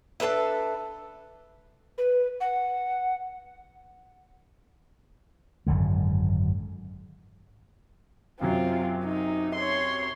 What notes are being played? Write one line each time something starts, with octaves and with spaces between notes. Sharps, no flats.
D4 A4 B4 E5
B4
F#5
G#1 F#2 D3 G#3
F#2 C3 F#3 C4 F4
D#4
C#5 C6